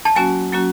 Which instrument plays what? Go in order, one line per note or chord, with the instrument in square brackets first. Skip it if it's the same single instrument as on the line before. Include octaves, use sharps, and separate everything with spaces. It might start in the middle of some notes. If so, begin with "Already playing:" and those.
[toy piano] A5
[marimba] F#3 A#3 C#4 F#4 [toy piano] G#5
[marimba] F#3 A#3 C#4 F#4